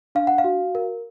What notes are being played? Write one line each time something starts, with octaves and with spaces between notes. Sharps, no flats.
D4 F5
F#5
F5
F#4
A#4